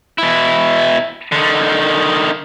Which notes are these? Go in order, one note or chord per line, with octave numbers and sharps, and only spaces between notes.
B2 E4
D3 D#3